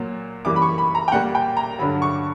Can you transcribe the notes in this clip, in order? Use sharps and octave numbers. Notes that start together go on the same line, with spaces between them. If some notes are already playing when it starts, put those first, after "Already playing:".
Already playing: A#2 F#3 A#3
F#2 E3 G3 A#3 D6
B5
C#6
B5
A#5
G5
A#2 G3 A#3 F#5
G5
A#5
G2 D3 F#3 B5
C#6